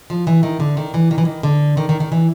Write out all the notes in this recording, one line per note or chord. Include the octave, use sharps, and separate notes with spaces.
F3
E3
D#3
D3
D#3
E3
D#3
E3
D#3
D3
D#3
D#3
D#3
E3